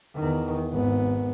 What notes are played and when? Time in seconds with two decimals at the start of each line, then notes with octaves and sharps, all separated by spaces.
0.16 E2 D#3
0.73 G#1 B3